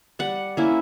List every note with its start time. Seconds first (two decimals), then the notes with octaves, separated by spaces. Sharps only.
0.19 G3 F#5
0.57 A#3 C#4 E4